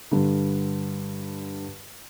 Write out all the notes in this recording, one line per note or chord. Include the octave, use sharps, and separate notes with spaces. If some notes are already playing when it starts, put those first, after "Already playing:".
G2 D3